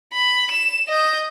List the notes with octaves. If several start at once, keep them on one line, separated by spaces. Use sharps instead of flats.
B5
E7
D#5 G6